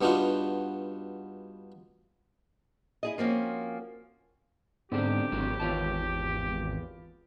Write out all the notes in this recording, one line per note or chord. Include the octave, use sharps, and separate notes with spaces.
G2 B3 D4 D#4 F4 F#4
E4 G#4 D#5
F3 A#3 C4 C#4 F#4
G#2 D3 B3 C4 G4 D5
G#1 A3 E4 F#4
G#1 E2 B3 F4 C#5 A5